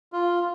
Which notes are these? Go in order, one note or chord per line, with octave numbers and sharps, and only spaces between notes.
F4